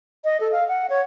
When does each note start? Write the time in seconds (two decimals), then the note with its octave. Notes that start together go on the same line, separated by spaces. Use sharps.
0.25 D#5
0.41 A4
0.52 F5
0.68 F#5
0.90 C#5